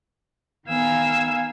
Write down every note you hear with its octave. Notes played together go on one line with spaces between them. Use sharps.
D#3 B3 F5 G#5 E6 G#6